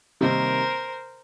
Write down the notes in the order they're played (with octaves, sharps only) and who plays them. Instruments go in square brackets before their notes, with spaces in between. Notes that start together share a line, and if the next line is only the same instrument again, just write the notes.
[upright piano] C3 D#3 G3 A#3 D#4 [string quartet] A#4 C5